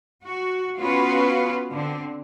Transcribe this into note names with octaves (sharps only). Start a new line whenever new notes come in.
F#4
B3 C#4 F4 F#4 B4
D3 C4